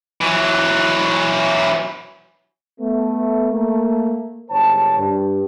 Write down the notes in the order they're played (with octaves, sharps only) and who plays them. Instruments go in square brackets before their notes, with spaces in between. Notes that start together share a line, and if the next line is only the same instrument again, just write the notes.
[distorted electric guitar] E3 F#3
[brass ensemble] A3 B3
A3 A#3
G1 G#2 C5 C#5 A5
G2